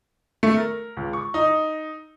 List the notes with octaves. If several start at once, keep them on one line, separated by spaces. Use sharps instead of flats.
A3
A#4
C#2
C#6
D#4